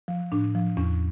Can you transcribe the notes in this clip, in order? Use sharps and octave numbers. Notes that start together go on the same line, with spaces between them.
F3
A2 D4
F3
E2 C#4